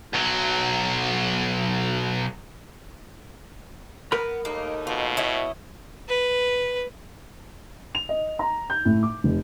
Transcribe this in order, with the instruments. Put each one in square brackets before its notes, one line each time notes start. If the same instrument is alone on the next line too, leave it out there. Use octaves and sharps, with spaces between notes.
[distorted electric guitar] B1 F#3
[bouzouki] B3 [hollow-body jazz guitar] A#4 B5
[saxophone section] D#2 A3 D#4 [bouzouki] A#3
[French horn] B2 [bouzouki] F4
[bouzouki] E4 C#5 D#5
[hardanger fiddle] B4
[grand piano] F7
D#5
A#5
G6
A2
D6
F1